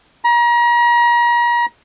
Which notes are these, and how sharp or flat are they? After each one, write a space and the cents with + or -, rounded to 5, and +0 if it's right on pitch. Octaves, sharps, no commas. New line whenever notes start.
A#5 +35